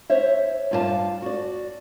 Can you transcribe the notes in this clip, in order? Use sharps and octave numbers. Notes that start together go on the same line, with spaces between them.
C5 C#5 E5
G2 D#4 F4 A#4 F5 A5
F#4 D5